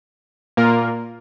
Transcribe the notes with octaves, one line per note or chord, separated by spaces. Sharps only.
A#2 A#3 F4 A#4